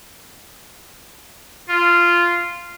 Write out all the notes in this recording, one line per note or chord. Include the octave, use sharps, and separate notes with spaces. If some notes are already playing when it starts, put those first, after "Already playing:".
F4